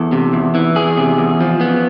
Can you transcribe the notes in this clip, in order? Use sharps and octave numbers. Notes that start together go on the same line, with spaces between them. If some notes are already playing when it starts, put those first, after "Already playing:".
Already playing: E2 A4
C3
E2
E3
E2 G#4
C3
E2
F3
B3